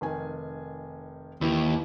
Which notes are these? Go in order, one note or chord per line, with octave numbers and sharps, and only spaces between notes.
F1 D#3 G#5
D#2 E3 E4